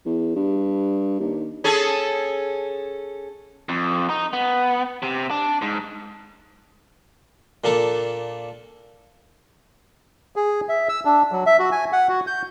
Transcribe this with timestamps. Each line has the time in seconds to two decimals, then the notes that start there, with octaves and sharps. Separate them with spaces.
0.06 E2
0.36 G2
1.20 D#2
1.64 C#4 G#4 A4
3.69 F2
4.09 D#4
4.33 B3
5.03 C3
5.31 D4
5.62 G#2
7.64 A#2 A#3 D4 A4
10.36 G#4
10.69 E5
10.89 E6
11.05 D4
11.32 F#3
11.46 E5
11.59 F#4
11.72 G#5
11.93 F#5
12.09 F#4
12.27 G6